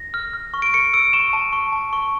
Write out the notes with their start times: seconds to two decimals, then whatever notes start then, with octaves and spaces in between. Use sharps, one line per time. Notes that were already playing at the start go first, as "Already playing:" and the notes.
Already playing: A#6
0.14 F6
0.33 F6
0.54 C#6
0.62 D7
0.74 C#6 C#7
0.93 E6 D7
1.13 C#6 E7
1.33 A5
1.53 C#6
1.72 A5
1.93 C#6